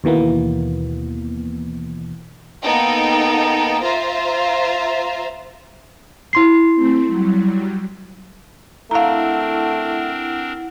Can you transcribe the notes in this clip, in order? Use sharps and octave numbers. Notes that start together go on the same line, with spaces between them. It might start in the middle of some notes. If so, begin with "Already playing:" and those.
D#2 B2 E3 A#3 B3
A#3 B3 D#4 A4 G5
F4 C5 E5 F5 A#5
E4 C6 C7
A3 C4
F#3 G3
A3 C4 D4 E4 A#4 F5 F#5 A#5